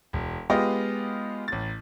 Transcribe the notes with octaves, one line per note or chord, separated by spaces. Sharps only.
E1
G#3 B3 F4 G4 D#5
A1 A6